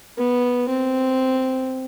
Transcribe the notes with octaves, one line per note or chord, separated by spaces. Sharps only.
B3
C4